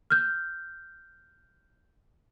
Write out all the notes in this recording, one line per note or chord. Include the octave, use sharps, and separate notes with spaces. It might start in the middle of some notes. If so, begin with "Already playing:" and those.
F6 G6